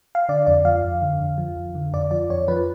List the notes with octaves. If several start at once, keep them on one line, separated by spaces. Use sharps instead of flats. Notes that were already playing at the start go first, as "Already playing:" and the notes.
F5
D3 D5
F2 D5
F3 F5
F2
D3
F2
F3
F2
D3
F2 D5
F3 D5
F2 C#5
F3 B4